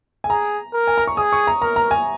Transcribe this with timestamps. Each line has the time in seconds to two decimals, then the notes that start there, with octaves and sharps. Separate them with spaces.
0.24 G#5
0.29 G#4 A#5
0.73 A#4
0.87 G#5
0.98 A#5
1.07 C#6
1.17 G#4 D#6
1.32 C#6
1.47 A#5
1.62 A#4 A#5
1.76 A#5
1.91 G#5